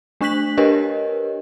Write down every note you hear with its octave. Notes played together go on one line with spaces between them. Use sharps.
A3 D4 C#6 F#6 B6 F#7
D4 G4 A#4 B4 C#5 D#5